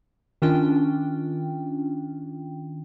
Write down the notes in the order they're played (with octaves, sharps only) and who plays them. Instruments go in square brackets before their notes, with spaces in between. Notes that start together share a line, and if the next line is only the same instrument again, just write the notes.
[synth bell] D#3 C#4 D4 F4 G5